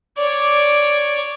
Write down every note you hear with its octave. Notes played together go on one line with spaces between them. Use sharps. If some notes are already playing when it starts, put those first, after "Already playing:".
C#5 D5